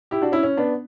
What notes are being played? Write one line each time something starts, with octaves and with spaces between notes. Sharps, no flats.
E4 G4
D4 F#4
C#4 E4
C#4
B3 D4